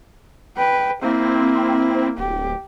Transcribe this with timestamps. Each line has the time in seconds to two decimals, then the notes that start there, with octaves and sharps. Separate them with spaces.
0.57 B4 G5
1.02 A#3 C4 E4
2.18 D1 G4